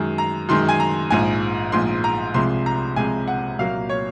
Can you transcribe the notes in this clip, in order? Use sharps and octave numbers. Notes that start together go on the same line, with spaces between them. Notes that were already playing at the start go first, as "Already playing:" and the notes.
Already playing: F#2 D#3 G#3
A#5
F#2 D#3 G#3 C6
G#5
A#5
A#1 G#2 F3 G#5
A#1 G#2 F3 C6
A#5
C2 C3 F3 G#3 C6
A#5
C2 C3 F3 G#3 G#5
F#5
C2 A#2 F#3 A#3 F5
C#5